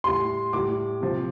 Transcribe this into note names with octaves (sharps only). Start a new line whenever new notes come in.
A2 G3 C6
A2 G3 D6
C3 F3